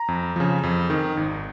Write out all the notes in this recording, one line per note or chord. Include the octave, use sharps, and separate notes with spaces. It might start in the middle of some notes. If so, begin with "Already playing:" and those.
Already playing: A#5
F2
C#3 F3
F2
D#3
G#1